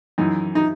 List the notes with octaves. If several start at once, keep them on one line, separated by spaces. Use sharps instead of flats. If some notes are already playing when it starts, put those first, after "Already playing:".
F#2 E3 D#4
D#4